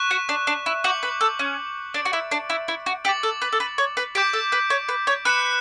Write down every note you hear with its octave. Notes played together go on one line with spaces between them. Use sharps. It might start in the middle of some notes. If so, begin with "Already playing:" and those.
Already playing: C#6 F#6 B6 E7
F#4
D4
D4
E4
F#4 D6 G6 C#7 F#7
B4
A4
C#4
D4 A6 D7 F#7
F#4
E4
D4
E4
E4
F#4
G4 D6 A6 C#7 F#7
A4
B4
A4
B4
C#5
B4
G4 D6 G6 B6 D7
A4
B4
C#5
B4
C#5
B4 F#6 C#7 E7